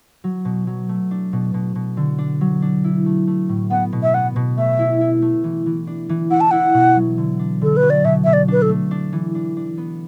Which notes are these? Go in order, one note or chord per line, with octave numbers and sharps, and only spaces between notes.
F#3
B2
F#3
A3
D4
B2
B2
B2
D3
D4
F#3
D4
E4
A3
A3
A2
B3 F#5
B2
E5
B3 F#5
B2
A3 E5
E4
E4
A3
E3
E3
D4
E3
E4 F#5
A5
E4 F#5
B2
F#3
D3
D4
D3 A4
B4
F#3
D5
B2 E5
B2 E5
D5
D4 B4
A4
A3
D4
E3
D4
D4
B3